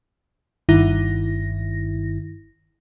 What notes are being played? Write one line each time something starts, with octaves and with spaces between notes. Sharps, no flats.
G1 G2 D#3 E4 A#6